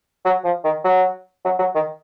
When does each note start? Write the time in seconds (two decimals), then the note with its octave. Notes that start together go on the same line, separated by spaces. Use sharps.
0.25 F#3
0.44 F3
0.64 D#3
0.85 F#3
1.45 F#3
1.59 F#3
1.75 D#3